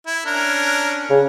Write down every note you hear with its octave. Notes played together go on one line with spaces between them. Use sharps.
E4
C#4 D4 A#4
C#3